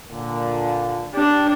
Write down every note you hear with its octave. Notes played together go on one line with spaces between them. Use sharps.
A#2 D3
D4 G4